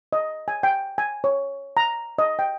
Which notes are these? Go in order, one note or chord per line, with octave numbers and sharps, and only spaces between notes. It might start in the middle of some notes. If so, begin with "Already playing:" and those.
D#5
G#5
G5
G#5
C#5
A#5
D#5
G5